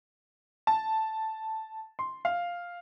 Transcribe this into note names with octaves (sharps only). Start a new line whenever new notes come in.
A5
C6
F5